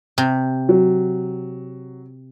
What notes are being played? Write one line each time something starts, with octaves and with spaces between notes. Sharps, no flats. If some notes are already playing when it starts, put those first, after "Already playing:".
C3
F#3